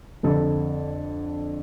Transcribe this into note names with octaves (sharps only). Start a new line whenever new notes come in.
F2 D3 A4